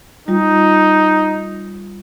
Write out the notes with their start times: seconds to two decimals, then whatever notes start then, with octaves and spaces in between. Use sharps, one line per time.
0.28 G3 D#4 F4